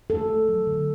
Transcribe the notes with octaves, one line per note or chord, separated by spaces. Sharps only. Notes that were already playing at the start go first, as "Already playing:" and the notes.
A3 A4
A3
F#3
D3